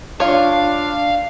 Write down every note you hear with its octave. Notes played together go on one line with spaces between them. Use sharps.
D4 F4 C#5 F5